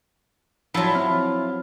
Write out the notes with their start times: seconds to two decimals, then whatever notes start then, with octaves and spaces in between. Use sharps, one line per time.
0.74 F3 F#3 E4 F4
0.95 C4 F6